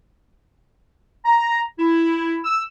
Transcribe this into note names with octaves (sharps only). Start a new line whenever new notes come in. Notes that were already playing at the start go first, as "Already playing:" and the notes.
A#5
E4
E6